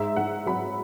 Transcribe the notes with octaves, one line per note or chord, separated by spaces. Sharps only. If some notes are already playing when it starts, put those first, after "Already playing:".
Already playing: G#2 E5
G#2 F#5
F#3 B5